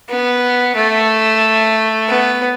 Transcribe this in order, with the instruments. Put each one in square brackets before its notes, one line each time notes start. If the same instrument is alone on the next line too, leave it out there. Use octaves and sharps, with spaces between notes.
[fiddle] B3
A3
B3